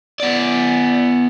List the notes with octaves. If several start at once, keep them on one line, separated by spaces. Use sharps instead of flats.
B3 D5